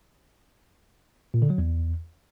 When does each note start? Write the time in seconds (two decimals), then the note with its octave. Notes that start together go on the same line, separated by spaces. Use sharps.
1.34 A#2
1.42 D3
1.50 F#3
1.58 E2